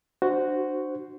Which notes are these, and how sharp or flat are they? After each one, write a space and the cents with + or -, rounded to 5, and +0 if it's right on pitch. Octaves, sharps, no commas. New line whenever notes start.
D4 +30 F#4 +0 C5 -10